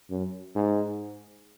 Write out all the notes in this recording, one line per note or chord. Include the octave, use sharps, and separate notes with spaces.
F#2
G#2